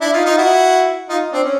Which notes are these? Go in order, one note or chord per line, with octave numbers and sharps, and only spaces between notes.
D4 E4
D#4 F4
D#4 F4
E4 F#4
D#4 F4
C4 D4
C#4